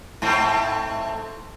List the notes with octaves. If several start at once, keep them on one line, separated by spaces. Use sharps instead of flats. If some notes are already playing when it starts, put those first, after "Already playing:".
G#2 A3 C4